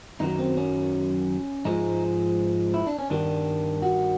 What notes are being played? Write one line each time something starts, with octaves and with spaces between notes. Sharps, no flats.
F#2 D#3 F#3 D#4
C4
C#4
G#2 F3 G#3 D#4
E4
D4
C#4
G2 D#3 G3 D4
F#4